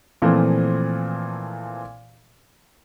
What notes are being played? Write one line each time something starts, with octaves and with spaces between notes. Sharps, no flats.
A#2 E3 F3 A3 C4